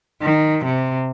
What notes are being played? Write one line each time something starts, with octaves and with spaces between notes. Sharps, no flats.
D#3
C3